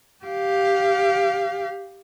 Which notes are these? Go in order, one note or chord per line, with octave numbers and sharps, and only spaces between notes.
G4 F5